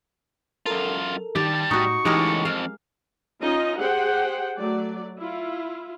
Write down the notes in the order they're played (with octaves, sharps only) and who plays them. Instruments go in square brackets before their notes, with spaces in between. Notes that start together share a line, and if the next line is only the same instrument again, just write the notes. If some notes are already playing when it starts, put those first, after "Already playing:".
[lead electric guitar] F#2 F4 [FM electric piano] A4 A#4
[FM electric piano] D#3 [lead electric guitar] G3 A5 [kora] G4
[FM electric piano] A2 [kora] D#4 F#4 [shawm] C#6
[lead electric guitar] C#2 A2 [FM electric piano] E3 D#4 [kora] G#3 G4 A#4
[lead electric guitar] F2 [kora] F5
[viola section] C#4 D#4 F4 D#5
G4 G#4 C5 F#5 G5
F#3 A3 D5
E4 F4